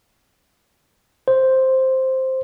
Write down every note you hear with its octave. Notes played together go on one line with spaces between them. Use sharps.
C5